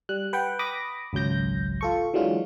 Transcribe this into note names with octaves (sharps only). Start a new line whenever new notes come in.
G3 F#6
B4 F#5 G5
B5 D6 D#6 A#6
G#1 C#2 F#3 G6 A#6
F4 A4 C#6
E3 F#3 G#3 D4 F4 F#4